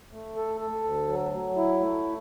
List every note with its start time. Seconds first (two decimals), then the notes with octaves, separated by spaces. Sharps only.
0.12 A3
0.36 A4
0.61 A4
0.84 D2
1.08 F#3
1.33 F#3
1.57 E4
1.80 A3